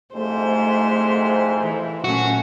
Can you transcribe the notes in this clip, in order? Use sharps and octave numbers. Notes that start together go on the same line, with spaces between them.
C2 F2 G#2 A3 C5
E3
A#2 F#3 A3 C#4 F#4